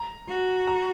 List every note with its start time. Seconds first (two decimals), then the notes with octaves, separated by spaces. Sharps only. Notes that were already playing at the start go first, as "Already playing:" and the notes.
Already playing: A#5
0.28 F#4
0.67 A#5